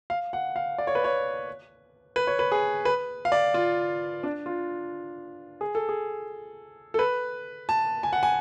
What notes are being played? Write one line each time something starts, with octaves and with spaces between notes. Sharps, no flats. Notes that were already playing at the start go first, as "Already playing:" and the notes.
F5
F#5
F5
D5
C#5
B4
C#5
B4
C#5
B4
G#4
B4
F5
D5
F4
D4
F4
G#4
A4
G#4
A4
B4
A5
G#5
F#5
G#5